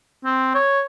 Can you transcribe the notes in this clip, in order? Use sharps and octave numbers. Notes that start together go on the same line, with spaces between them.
C4
C#5